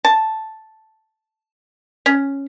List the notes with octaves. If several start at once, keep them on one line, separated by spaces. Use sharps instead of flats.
A5
C#4